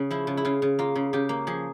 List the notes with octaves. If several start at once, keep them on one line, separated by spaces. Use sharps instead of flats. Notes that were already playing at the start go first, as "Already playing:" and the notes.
Already playing: C#3 G#4
F3 E4
C#3
E4
C#3 F4
C#3
A#3 F4
C#3
C#3 G4
A#3
F3 G#4